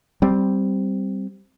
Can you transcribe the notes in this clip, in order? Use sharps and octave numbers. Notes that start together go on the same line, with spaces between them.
G3 C4